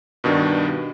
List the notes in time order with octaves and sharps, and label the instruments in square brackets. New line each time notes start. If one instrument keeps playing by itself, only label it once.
[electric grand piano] G2 B2 D#3 D4